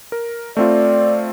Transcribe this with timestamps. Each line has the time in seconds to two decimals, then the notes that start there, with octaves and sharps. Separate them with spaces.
0.12 A#4
0.57 A3 C4 F4 D5